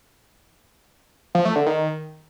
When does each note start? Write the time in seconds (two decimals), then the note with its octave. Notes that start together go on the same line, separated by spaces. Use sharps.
1.35 F3
1.45 A3
1.56 D3
1.66 D#3